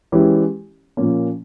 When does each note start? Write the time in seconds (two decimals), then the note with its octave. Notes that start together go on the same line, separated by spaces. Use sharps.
0.12 E3 G#3 C#4 E4 G4
0.97 A#2 F3 A#3 C#4